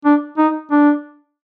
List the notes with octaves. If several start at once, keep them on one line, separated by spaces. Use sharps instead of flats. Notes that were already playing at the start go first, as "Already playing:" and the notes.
D4
D#4
D4